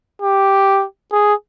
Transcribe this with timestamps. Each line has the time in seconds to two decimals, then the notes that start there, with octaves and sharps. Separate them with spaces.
0.22 G4
1.12 G#4